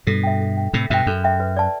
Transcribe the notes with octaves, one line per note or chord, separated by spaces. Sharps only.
G2 B2 A4
E5 G5
A4
E5 G5
A2 C3 A4
G2 B2 E5 G5
F#2 A4
E5 G5
B4
D5 A5